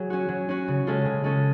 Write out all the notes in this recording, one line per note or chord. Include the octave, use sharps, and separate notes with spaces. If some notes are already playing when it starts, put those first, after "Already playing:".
Already playing: F#3 G#4
C#4 F#4
F#3
C#4 F#4
C#3
G#3 C#4 F4 A4
C#3
G#3 C#4 F4 A4